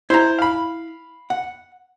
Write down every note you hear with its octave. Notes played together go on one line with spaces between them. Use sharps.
E4 C5 A#5
F5 B5
F#5